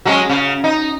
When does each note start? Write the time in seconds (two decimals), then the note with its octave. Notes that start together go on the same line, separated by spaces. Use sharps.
0.05 F#3 G#3 C#4
0.29 C#3
0.64 D#4